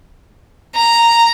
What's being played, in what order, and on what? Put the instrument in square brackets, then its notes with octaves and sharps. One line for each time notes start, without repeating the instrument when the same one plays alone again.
[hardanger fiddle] A#5